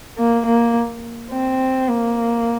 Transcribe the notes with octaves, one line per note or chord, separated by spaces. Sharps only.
A#3
A#3
C4
A#3